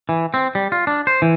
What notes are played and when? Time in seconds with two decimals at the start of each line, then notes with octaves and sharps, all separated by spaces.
0.09 E3
0.34 C4
0.55 G3
0.72 F4
0.87 D4
1.07 C5
1.22 E3